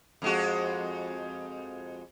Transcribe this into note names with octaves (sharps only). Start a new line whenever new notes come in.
F2 G#3 F#4